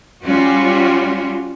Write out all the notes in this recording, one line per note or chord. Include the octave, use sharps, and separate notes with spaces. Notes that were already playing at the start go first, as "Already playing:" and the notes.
G3 C#4 F4 F#4